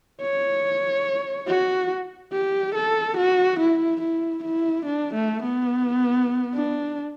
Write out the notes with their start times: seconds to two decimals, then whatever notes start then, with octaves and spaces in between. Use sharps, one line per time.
0.21 C#5
1.48 F#4
2.32 G4
2.75 A4
3.17 F#4
3.59 E4
4.01 E4
4.44 E4
4.86 D4
5.15 A3
5.43 B3
6.55 D4